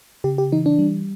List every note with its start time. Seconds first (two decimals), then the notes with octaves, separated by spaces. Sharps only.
0.24 C#3 G4
0.38 G4
0.52 E3 D#4
0.66 D4
0.79 G3